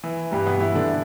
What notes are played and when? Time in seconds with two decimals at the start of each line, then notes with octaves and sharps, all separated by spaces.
0.04 E3
0.32 G2 G3
0.46 B2 B3
0.61 E3 E4
0.75 D3 D4